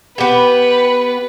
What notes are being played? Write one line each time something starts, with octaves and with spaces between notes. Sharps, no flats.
B3 G4 B4